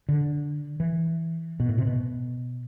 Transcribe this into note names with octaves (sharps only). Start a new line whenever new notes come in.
D3
E3
B2
A2
C3
B2